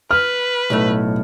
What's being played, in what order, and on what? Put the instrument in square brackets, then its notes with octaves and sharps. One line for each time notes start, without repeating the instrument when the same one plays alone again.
[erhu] B4 [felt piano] F6
[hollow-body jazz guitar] B1 A2 A3